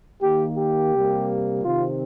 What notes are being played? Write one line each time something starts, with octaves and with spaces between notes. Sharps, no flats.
D#3 A#3 G4
G4
C3 G3 A#3
C3 D#3 C4 F4